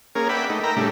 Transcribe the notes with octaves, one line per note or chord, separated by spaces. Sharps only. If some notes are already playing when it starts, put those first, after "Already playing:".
A#3 C#4 G#4 A#4
B4 D5 E5 F#5 G5 B5
A3 D#4
A#4 E5 G5 A#5 B5
A2 C#3 G3 A3 D4